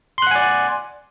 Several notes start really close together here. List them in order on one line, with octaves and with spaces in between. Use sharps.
C6 F#6 F#5 G#5 D5